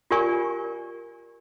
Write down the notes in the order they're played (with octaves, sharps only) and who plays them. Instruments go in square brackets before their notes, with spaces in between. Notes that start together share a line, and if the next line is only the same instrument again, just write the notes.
[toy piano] F4 G4 A#4 D5 G#5 C#6